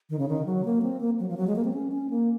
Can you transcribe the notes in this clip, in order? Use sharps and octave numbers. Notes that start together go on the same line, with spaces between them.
D#3
C#3
D#3
F#3
A#3
C4
A#3
F#3
F3
F#3
G#3
A#3
C4
C#4
C#4
A#3